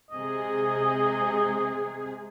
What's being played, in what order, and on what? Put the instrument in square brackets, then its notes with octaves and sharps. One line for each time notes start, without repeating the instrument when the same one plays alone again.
[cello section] C3 G#3 G#4 [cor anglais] D#5